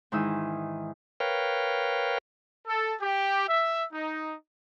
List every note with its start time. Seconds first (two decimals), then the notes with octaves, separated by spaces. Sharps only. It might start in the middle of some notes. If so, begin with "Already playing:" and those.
0.12 G#2 D#3 E3 D#6 E6
1.20 A#4 B4 C#5 F5 G5
2.66 A4
3.00 G4
3.48 E5
3.92 D#4